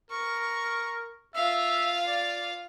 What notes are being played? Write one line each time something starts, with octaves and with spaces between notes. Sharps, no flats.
A#4 C#6
F4 E5 F5
D5